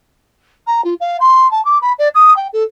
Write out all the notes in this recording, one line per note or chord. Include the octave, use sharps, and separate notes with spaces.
A#5
F4
F5
C6
A5
D6
B5
D5
D#6
G5
A4